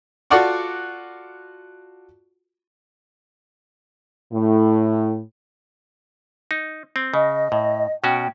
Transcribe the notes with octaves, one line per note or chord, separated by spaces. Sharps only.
F4 F#4 A4 D5 F#5 C#6
A2
D#4
C4
C#3 D#5
A2
B2 C#4 F#4 G5